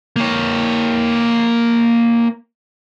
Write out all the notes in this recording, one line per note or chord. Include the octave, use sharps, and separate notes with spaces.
A#3 C#5